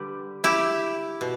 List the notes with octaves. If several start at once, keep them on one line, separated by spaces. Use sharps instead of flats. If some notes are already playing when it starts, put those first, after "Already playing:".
Already playing: D3 G3 G4 B4
E4 G4
B2